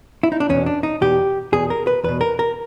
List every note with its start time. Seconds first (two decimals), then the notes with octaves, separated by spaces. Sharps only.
0.23 E4
0.32 D#4
0.40 D4
0.49 E2 B2 C#4
0.66 D4
0.83 D#4
1.01 E2 B2 G4
1.52 E2 B2 G#4
1.70 A#4
1.87 B4
2.04 E2 B2 B4
2.21 A#4
2.39 A#4